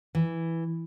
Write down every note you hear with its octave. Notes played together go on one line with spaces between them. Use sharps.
E3